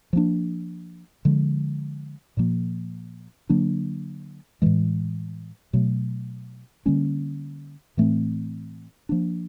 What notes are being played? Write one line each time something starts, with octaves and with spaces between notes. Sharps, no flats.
F3 A#3 D4
D3 F3 G#3
A#2 F3 A#3
D3 F#3 A#3 D4
A2 E3 G#3
B2 F#3 A3
D3 G3 A#3 C#4
A2 E3 A3 C4
F3 A#3 D4